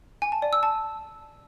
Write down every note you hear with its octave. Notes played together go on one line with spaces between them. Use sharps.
G#5
A5
D5
E6
A5